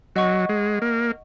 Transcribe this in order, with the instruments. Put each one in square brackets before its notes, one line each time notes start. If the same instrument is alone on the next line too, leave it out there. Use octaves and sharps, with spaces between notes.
[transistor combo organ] F#3 [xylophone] D#5 F#5 C#6
[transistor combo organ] G#3
A#3